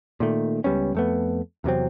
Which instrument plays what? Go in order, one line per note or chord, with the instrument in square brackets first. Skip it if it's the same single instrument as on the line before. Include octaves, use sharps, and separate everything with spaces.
[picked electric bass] A#2 D#3 A3
C#2 G3 B3 C#4
F2 A3 B3
E2 C3 F#3 C4